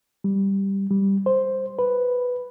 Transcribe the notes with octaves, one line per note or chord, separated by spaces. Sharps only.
G3
G3
C5
B4